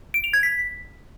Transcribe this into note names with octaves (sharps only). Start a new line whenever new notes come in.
D7
F7
G#6
B6